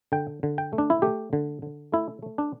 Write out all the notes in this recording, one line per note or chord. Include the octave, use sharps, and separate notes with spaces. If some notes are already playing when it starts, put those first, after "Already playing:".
D3 G5
D3
G5
A3
D4
E4
A3 G4
D3
D3
A3 E4
A3
D4